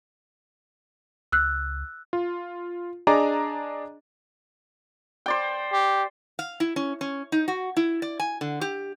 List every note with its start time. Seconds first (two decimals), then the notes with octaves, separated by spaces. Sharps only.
1.32 C#2 E6 F#6
2.13 F4
3.07 D4 G#4 D5 D#5 A#5 D6
5.26 C5 D5 G5
5.72 G4
6.39 F5
6.60 E4
6.76 C#4
7.01 C#4
7.32 D#4
7.48 F#4
7.77 E4
8.02 D5
8.20 G#5
8.41 D3
8.61 G4